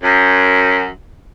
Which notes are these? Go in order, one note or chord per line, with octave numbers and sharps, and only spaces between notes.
F#2